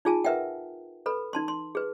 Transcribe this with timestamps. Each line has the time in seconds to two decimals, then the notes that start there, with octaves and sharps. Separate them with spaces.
0.05 D#4 F4 G#4 G#5 A5
0.24 A#4 B4 E5 F#5 G5
1.06 A4 B4 B5
1.33 D#4 A5 C6
1.48 C6
1.75 G#4 B4